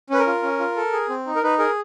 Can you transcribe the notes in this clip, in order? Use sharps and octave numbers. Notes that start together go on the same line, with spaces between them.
C#4 B4
A#4
F4
C#4
F4
A4
G#4
C4
D#4
A#4
D#4 B4
G#4 A#4